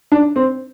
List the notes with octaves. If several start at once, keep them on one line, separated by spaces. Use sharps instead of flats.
D4
C4